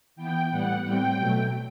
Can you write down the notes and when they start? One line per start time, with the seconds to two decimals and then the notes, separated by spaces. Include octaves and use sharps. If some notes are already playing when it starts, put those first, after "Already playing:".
0.16 E3 B3 G5
0.50 A2 G3 B3 F#5
0.83 A2 G3 C4 G5
1.17 B2 F#3 A3